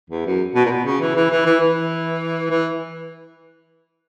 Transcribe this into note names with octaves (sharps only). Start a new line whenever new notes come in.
E2
F#2
B2
A#2
B2
C#3
E3
E3
E3
E3
E3
E3